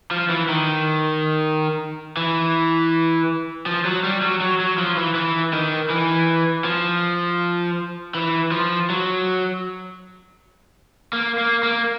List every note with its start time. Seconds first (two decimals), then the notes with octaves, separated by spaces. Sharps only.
0.11 F3
0.30 E3
0.49 D#3
2.17 E3
3.66 F3
3.85 F#3
4.04 G3
4.22 F#3
4.41 F#3
4.60 F#3
4.78 F3
4.97 E3
5.15 E3
5.53 D#3
5.90 E3
6.65 F3
8.15 E3
8.52 F3
8.90 F#3
11.13 A#3
11.38 A#3
11.63 A#3